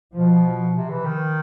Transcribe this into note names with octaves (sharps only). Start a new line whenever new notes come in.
B2 F3
C3
E3
D#3